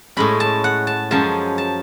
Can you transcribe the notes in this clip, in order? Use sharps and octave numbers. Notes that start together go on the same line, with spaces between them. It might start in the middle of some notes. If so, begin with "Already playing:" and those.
A2 G#3 C#4 B5
A5
F#5
A5
F#2 F3 G#3 C#4 A5
A5